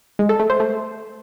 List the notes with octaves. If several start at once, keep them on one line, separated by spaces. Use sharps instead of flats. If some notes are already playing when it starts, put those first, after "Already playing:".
G#3
A4
A3
C5
A3